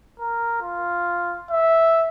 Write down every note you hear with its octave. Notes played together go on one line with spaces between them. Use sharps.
A#4
F4
E5